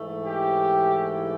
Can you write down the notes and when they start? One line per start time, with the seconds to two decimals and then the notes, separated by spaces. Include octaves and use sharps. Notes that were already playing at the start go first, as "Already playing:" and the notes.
Already playing: G#2 E3 A3
0.24 G4